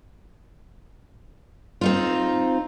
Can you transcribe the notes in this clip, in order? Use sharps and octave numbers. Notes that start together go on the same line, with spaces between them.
C4 D#4 F4